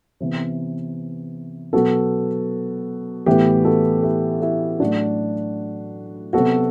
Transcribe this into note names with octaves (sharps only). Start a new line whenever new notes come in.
C3 E3 B3
B2 F#3 B3 F#4 A4
A2 E3 B3 G4 B4
F#4 A4
E4 G4
E4 G4
A2 F#3 A3 D4 F#4
C3 F#3 B3 F#4 A4